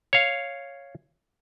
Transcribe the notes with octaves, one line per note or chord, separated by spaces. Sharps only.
C#5 F5